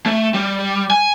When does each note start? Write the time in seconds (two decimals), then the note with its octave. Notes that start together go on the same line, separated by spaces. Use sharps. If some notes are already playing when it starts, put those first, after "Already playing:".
0.06 A3
0.34 G3
0.90 G#5